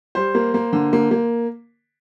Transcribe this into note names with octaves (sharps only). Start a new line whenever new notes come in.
G3 C5
A#3
A#3
D3
A#3
A#3